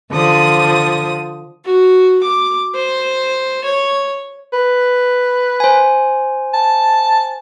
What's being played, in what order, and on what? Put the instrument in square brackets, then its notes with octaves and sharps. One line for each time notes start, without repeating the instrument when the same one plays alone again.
[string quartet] D3 F3 D#6
[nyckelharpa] F#4
D6
C5
C#5
[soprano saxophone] B4
[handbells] C5 G#5
[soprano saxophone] A5